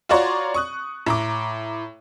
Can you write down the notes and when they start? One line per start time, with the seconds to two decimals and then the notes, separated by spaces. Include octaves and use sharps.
0.09 F4 F#4 C#5 D5 A#5 C6
0.54 C#6 D#6 F#6
1.06 A2 A#5 D6